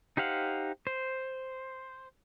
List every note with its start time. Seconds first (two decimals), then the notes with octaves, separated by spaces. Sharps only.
0.17 D#4 G4 C5 F5 F#5
0.87 C5